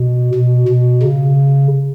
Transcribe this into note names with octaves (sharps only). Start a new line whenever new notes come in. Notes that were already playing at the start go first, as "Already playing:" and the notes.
Already playing: B2
B2
B2
C#3